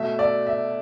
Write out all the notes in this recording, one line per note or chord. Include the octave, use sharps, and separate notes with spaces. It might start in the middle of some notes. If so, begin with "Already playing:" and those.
Already playing: B2 A3 E5
D5
E5